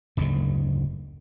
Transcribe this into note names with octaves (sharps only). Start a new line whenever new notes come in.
F#1 D2 G#2